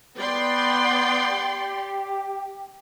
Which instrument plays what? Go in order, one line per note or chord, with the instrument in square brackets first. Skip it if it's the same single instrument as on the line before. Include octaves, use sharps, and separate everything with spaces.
[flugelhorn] B3 [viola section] D5 G5 C6
[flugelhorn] G4